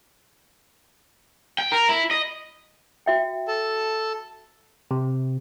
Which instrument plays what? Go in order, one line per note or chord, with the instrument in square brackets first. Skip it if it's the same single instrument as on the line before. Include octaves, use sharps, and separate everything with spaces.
[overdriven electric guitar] G5
A#4
E4
D#5
[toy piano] F#4 E5 G5
[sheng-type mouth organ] A4 A5
[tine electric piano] C3